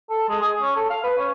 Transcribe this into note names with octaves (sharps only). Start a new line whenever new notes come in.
A4
G#3
G#4
C#4
A4
F5
B4
C#4